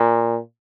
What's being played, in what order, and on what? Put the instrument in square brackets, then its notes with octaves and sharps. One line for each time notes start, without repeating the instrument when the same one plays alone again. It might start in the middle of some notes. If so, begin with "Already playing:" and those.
Already playing: [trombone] A#2